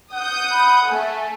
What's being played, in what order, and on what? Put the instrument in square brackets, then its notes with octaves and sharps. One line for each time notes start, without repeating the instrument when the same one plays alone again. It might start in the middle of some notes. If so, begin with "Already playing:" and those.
[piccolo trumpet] F#5 [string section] D#6 G6
[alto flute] B5
[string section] A3 A4 [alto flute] G#5